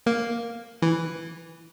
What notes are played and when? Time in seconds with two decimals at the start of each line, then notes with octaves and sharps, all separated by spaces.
0.06 A#3
0.82 E3